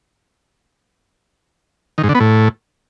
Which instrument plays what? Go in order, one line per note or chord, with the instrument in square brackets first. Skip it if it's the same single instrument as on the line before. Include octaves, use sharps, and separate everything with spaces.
[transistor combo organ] D#3
G#2
D3
B3
A2